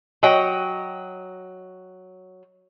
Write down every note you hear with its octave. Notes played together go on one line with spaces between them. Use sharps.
F#3 D#5 G5